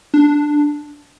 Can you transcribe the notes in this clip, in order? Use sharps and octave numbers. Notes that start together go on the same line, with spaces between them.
D4